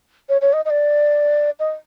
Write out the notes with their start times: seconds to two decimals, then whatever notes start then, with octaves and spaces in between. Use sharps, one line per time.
0.29 C#5
0.41 C#5
0.53 D#5
0.65 D#5
0.70 D5
1.60 D#5